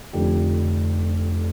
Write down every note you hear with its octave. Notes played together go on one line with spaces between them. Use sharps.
F1 F2 D3 G4